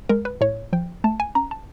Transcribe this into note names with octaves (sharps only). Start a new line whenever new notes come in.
G#3 A#4
B4
A2 C#5
F3 G5
A3 A5
G#5
C#4 A#5
A5